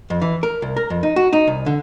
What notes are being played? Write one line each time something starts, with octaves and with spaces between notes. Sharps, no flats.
F2
E3
A#4
C2
A#4
F2
D#4
F#4
D#4
C2
D3